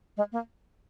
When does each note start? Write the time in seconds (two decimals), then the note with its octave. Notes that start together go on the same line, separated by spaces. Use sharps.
0.17 G#3
0.32 A#3